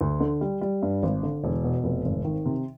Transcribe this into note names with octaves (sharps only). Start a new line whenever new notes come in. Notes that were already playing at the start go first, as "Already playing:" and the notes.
D2
D3
G3
G3
G2
G#1
D3
E1
B2
F1
G#1
D#3
C3